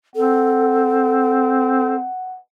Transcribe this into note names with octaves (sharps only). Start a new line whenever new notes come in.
C4 A4 F#5